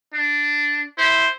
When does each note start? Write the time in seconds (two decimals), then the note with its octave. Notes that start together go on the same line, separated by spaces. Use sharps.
0.14 D4
0.98 E4 C5